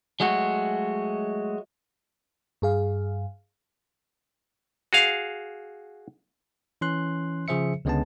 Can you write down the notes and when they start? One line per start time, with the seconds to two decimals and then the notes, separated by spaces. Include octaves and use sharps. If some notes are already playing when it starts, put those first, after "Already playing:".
0.20 F#3 G#3 A3 F#4
2.62 G2 G#4 F5
4.93 F#4 G#4 F5
6.81 E3 C#4 C6 F#6
7.48 C#3 F3 G#4 C5 E5 C#7
7.85 C#2 D3 G#3 B3 C#4 A5